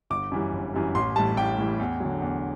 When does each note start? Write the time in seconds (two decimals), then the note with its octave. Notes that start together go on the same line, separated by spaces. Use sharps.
0.10 G1 D6
0.32 F#2 E3 G3
0.53 G1
0.74 F#2 E3 G3
0.95 A1 C6
1.16 A2 E3 G3 A5
1.37 A1 G5
1.58 A2 E3 G3
1.79 E2
2.00 D3 F#3
2.22 E2